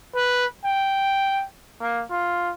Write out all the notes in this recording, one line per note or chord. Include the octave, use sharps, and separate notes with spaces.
B4
G5
A#3
F4